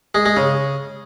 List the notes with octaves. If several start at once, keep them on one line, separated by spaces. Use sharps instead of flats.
G#3
G#3
C#3